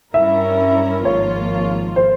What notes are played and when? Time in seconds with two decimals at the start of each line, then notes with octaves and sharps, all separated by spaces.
0.14 G2 G3 C#4 E4 A#4 E5
1.05 G#1 G#2 F3 A#3 F4 C#5
1.96 C5